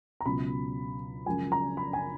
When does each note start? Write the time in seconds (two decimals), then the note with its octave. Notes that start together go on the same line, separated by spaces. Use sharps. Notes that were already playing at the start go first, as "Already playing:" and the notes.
0.21 A#5
0.26 C#2 B2 F#3 B5
1.26 F#1 F#2 C#3 F3 G#3 G#5
1.52 A#5
1.77 B5
1.93 G#5